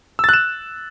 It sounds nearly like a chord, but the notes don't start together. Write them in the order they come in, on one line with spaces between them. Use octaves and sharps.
E6 A6 F#6 E7